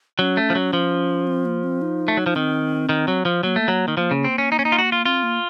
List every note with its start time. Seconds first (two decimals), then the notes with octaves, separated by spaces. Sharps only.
0.19 F#3 C#4
0.37 A3
0.50 F3
0.55 F#3
0.73 F3
1.27 C4
1.45 A#3
1.63 C4
1.82 D#4
2.08 A3
2.17 F#3
2.26 F3
2.35 D#3 C4
2.89 D#3
3.08 F#3
3.25 F3
3.43 F#3 A#3
3.56 A3
3.68 F#3
3.88 D#3
3.97 F3 A#3
4.11 C#3
4.24 C4
4.38 C#4
4.52 D#4
4.59 C#4
4.65 D#4
4.72 F4
4.78 F#4
4.92 F4
5.05 C4 F4
5.23 A#3